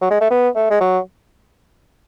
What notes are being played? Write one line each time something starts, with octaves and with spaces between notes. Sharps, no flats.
F#3
G#3
A3
B3
A3
G#3
F#3